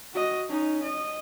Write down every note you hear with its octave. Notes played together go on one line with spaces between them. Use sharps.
F#4 D#5
C#4 D#4
D#5